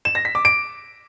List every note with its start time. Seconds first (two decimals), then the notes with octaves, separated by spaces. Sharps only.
0.05 E7
0.15 A#6
0.25 B6
0.35 D6
0.45 D7